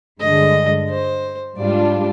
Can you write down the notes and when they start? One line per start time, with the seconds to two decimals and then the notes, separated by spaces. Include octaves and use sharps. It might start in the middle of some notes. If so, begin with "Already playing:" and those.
0.20 G2 D3 G#3 D#5
0.90 C5
1.57 G#2 G3 D4 F4 D5